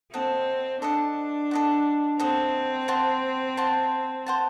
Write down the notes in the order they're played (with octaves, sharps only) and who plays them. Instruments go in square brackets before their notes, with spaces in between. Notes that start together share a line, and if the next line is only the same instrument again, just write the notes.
[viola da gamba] C4 [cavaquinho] A4 D#5 F#5
[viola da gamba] D4 [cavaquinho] A4 D#5 F#5
[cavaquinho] A4 D#5 F#5
[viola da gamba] C4 [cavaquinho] A4 D#5 F#5
[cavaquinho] C5 F#5 A5
C5 F#5 A5
C5 F#5 A5